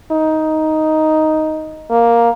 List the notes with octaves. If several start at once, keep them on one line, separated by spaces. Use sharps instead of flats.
D#4
A#3